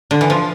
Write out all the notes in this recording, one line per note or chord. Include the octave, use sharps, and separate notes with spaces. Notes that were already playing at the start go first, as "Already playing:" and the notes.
D3
E3
F3